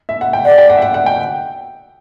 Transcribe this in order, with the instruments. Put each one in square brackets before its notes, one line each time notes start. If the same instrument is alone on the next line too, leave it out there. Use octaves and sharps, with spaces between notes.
[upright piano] E5
F#5
G5
[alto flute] D5 [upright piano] F#5
[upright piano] G5
F#5
E5
F#5
F#5
G5